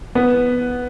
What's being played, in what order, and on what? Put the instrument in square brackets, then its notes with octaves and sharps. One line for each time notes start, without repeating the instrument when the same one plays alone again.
[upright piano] B3